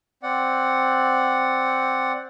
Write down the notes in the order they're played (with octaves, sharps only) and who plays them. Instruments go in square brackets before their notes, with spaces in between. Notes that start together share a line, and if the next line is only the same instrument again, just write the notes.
[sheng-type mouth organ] C4 D5 F#5